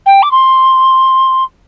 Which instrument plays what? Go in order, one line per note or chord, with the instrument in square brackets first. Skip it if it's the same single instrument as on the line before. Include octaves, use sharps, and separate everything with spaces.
[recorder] G5
D6
C6